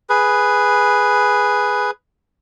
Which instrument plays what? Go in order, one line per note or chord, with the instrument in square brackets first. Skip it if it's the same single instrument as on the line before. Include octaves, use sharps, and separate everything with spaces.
[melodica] G#4 B4